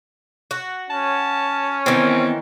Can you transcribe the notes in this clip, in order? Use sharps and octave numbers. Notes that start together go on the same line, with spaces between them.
F#4
C#4 A5
D#3 E3 B3 C4